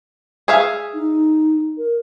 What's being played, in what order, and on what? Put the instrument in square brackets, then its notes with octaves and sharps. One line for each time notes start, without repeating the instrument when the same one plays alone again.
[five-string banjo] G#4 E5 F5
[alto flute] D#4
A#4